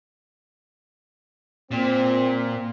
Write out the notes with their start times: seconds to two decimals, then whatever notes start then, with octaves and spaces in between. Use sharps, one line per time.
1.71 A#2 C4